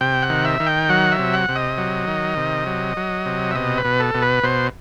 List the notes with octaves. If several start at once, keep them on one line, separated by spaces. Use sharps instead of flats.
C3 G5
F#5
D#3
E5
D#3
G5
F#3 F#5
E5
C3
F#5
C3
D#5
F#3
D#3
C3
F#3
F#3
C3
E5
B2 D#5
B4
B2
A4
B2
B4
B2 C5